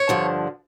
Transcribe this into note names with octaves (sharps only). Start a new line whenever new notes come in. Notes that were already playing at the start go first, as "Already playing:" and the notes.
Already playing: C#5
G2 D3 F3